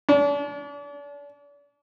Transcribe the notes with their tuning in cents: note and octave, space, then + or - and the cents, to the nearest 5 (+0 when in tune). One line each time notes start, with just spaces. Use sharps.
D4 -40